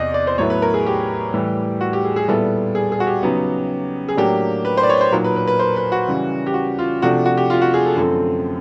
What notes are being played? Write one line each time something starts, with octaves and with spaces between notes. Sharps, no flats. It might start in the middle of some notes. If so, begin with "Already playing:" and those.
Already playing: E2 C3 E3 D5 D#5
D5
C5
A2 F#3 B3 E4 C#5
B4
A#4
G#4
G4
A2 E3 G3
F#4
G4
G#4
G#4
A#2 G3 B3 E4 A4
G#4
G#4
F#4
G4
C#3 F#3 B3 D#4
G#4
A2 F#3 A#3 D4 G4
B4
C5
D5
C#5
C5
A#2 F#3 A#3 D#4 A#4
B4
B4
B4
C5
B4
F#4
C#3 E3 G3
G4
F#4
F4
C3 F3 A3 D4 F#4
F#4
G4
F4
F#4
G#4
A4
F#2 D3 F3 A3 C4 A4